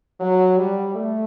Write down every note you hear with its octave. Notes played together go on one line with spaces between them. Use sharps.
F#3
G3
A3